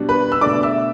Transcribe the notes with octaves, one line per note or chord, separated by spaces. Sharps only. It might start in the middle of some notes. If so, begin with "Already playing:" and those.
Already playing: B2 G3 D4
B4 B5
E6
B2 A3 D4 D5 D6
E5 E6